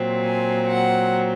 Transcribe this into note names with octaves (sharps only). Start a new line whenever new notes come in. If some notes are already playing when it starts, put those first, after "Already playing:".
Already playing: A#2 F#3 C4
G#5
F#5